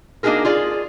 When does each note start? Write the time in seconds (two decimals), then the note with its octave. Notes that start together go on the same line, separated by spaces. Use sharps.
0.23 A#3 D4 D#4 F#4 G#4 A#4
0.45 F4 G#4 D5